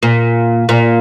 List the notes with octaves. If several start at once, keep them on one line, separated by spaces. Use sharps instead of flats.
A#2
A#2